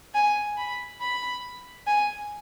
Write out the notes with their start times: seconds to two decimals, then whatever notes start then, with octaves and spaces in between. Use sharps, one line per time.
0.14 G#5
0.57 B5
1.01 B5
1.87 G#5